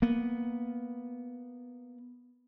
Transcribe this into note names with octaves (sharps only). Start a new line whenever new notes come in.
A#3 B3